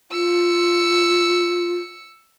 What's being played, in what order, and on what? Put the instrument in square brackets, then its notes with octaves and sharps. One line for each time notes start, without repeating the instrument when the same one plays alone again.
[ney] F4 [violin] E6 C#7